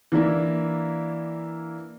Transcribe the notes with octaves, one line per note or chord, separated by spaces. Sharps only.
E3 A#3 D4 E4